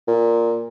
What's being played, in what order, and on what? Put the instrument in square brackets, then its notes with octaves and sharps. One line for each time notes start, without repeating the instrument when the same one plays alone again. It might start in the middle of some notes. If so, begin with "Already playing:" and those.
[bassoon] A#2